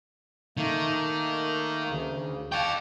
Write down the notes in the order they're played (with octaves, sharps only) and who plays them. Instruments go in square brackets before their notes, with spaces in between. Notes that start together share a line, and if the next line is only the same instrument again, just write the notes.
[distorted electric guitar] D#3 [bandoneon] A3 A#3
[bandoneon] D2 C#3
[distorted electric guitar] F5 G5 [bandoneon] A5 C#6 D6